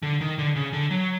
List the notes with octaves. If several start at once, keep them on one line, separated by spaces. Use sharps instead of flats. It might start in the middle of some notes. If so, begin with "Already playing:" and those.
D3
D#3
D3
C#3
D3
F#3